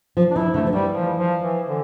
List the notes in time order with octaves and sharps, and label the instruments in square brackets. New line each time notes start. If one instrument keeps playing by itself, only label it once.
[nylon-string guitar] F3
[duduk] D4
[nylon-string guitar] E3 [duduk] E4
[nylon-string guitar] D3 [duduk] A3
[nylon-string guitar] F3
[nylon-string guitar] E3 [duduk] G3
[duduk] F3
F3
E3
D3